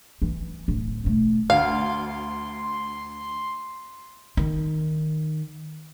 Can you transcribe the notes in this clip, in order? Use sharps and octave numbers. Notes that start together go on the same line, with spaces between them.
E3
D1
B2 A3
D2 F5 C6
D#3